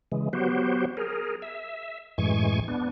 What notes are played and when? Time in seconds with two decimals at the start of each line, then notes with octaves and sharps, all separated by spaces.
0.12 C#3 E3 G#3
0.33 F#3 B3 F#4 G4 C5
0.97 G#4 A#4
1.42 E5
2.18 F#2 A2 E3 G#3 G#5 C#6
2.68 B3 D4